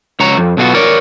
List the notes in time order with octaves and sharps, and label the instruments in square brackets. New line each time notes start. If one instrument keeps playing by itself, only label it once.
[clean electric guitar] C#2 C#5 A#5
F2
B1 B2 B3 F4 F#4
A#4 C#5 D5